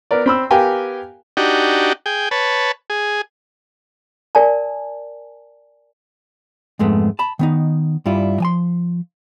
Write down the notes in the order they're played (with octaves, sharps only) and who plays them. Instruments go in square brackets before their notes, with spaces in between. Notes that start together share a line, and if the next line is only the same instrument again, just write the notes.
[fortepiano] B3 A#4 D5
C4 B5 E6
B3 G4 A#4 F5 G5 G#5
[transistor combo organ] D4 D#4 F#4 G4
G#4 G5
B4 C#5 A5
G#4
[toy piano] A#4 D5 G#5 A5
[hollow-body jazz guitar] F2 G#2 G#3 A3 B3
A5 B5
D#3 B3 D#4
G2 G3 E4 F4
F3 G#5 C6